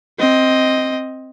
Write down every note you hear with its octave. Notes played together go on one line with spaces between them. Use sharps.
C4 D#5